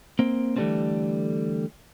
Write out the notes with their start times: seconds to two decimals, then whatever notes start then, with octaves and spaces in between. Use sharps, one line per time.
0.19 A#3 C4
0.56 D3 E3 F#3 G3 A3 C4